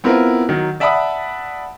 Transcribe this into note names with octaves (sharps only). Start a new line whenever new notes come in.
B3 C4 E4 F4 A#4
D#3 F#3
D5 E5 F#5 A5 B5 D#6